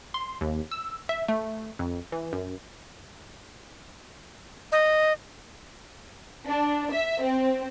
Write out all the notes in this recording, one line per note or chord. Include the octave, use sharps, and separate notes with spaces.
C6
D#2
E6
E5
A3
F2
E3
F#2
D#5
D4
E5
C4